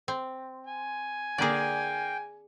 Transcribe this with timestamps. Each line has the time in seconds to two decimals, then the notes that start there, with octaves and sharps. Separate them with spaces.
0.08 C4
0.67 G#5
1.38 D3 A#3 G#4 D5 G5